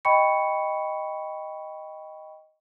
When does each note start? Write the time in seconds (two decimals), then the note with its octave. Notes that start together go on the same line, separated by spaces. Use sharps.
0.05 D#5 G5 B5 C#6 C#7